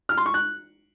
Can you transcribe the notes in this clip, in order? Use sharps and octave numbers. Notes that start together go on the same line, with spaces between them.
F6
C6
C#6
F#6